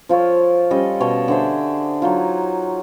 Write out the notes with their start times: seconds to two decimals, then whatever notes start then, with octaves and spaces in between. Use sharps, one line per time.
0.09 F3 F4 A4 C#5
0.71 G3 C#4 A4 D#5
1.00 B2 C#5 A5 C6
1.28 D3 G#4 C5 E5
2.02 F#3 D#4 F4